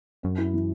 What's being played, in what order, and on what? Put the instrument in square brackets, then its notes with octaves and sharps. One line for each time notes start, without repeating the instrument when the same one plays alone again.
[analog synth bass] F#2 [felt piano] C#4
[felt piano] E4
E3